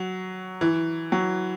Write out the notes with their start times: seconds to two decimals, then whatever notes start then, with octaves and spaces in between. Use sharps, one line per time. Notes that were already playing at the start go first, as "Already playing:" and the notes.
Already playing: F#3
0.61 E3
1.12 F#3